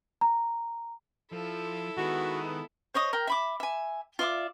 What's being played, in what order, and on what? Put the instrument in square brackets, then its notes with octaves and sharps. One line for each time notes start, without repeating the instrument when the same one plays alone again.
[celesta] A#5
[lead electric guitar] F3 [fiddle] E4 A4
[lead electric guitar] D#3 [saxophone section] G#3 B3 [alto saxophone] F#4
[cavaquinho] C5 C#5 D#5 D#6
A#4 G5
E5 B5 D6
E5 G#5
F4 D5 E5 D6